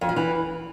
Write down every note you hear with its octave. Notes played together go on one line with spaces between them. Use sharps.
F2
F3
E3